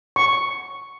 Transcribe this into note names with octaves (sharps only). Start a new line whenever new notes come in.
C#6